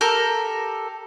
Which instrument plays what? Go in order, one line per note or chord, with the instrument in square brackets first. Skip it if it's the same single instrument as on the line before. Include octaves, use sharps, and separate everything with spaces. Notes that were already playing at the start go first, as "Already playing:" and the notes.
[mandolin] G4 A4 A#4